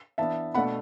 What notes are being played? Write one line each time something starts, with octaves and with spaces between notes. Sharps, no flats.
E3 B3 D4 E5 A5
B2 A3 D4 F#5 B5